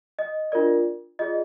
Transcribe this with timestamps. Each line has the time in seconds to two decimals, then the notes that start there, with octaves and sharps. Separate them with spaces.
0.19 D#5
0.52 D4 F4 A#4 D5
1.19 F4 G#4 D5 D#5